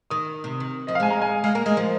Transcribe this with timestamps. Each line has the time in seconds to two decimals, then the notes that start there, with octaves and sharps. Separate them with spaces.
0.10 D#3 D#6
0.44 C3
0.60 D#3
0.87 F3 D#5
0.95 F5
1.00 G#3 G#5
1.10 A#5
1.22 G#5
1.44 G#3 F5
1.55 A#3 A#4
1.66 G#3 D#5
1.77 F3